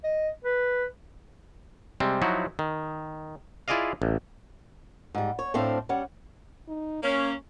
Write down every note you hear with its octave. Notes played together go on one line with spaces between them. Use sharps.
D#5
B4
C3 G3 G#3 C4
F3 F#3 D#4 E4 F#4
D#3
E4 F4 G#4 D5 D#5 F5
A1
G#2 G3
C#5
A2 A3 C4 D4 C5 F5
G3 C#4 F#5
D#4
A#3 C#4 C#5